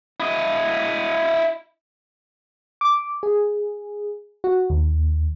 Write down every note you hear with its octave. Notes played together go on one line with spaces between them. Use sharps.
E4 D#5
D6
G#4
F#4
D#2